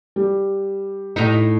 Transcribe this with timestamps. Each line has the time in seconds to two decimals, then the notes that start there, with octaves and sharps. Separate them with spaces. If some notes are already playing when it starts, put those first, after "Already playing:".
0.16 G3
1.16 A2 D#4